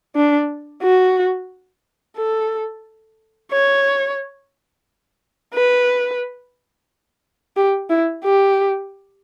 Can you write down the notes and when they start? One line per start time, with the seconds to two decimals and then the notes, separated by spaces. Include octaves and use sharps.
0.16 D4
0.83 F#4
2.17 A4
3.52 C#5
5.54 B4
7.57 G4
7.90 E4
8.24 G4